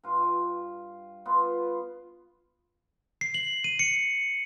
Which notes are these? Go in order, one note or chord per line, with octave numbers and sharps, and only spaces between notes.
G2 F4
B3 F4 C6
C7
F#7
D#7
C#7